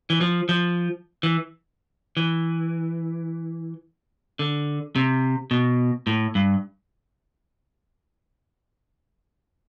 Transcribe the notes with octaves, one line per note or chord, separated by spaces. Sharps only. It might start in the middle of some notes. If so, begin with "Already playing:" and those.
E3
F3
F3
E3
E3
D3
C3
B2
A2
G2